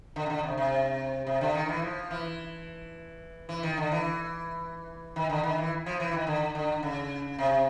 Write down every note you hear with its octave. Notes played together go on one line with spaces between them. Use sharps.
D3
C#3
D3
C3
C3
C3
D3
D#3
E3
F3
E3
E3
D#3
D3
E3
D#3
D3
D#3
E3
F3
E3
D#3
D3
D3
C#3
C3